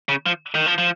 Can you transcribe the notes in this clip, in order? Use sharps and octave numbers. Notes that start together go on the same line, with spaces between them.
C#3
F3
D#3
F3
F3